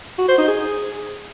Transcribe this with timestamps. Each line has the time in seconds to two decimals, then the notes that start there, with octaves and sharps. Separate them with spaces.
0.18 F#4
0.28 C5
0.38 D#4
0.48 G#4